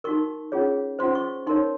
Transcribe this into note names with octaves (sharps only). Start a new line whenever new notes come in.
D#4 F#4 A#4 C#6
C#4 F4 G#4 C#5
C#4 F4 C5 C6
C#6
D#4 A#4 C#5 C6